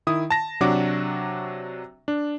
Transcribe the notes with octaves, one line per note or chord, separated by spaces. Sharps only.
D#3 E4 D#6
A5 A#6
C3 F#3 D4 F#4 D6
D4